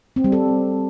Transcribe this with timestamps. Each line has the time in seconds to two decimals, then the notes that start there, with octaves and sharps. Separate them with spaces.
0.16 C4
0.24 G3
0.32 A4